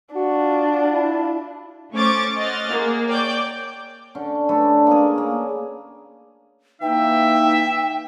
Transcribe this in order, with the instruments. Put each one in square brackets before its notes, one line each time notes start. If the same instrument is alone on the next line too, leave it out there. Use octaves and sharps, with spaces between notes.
[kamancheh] D4 F4 [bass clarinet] F#4
[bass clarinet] E4
[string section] A3 C#4 C5 C#6 D6 A6
C5 D#5 F#5 F6 A6
A#3 G#4
C#5 D5 G5 D6 G6
[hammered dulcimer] D3 C#4
A3 D4 A4 B4
A#3 C#4 G#4
A#3
[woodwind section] E3 A#3 D#4 [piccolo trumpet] E5 [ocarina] G5